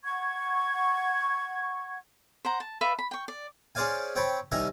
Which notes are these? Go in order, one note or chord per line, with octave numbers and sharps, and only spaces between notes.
F#5 C#6 G#6
C5 F#5 A#5
A5
B4 D5 E5 F5
B5
G5 C#6
D5
C#4 G#4 C5 D5 F5 G#5
C4 C#5 G5 A5 B5
C2 D#3 G3 E5 G#5 A#5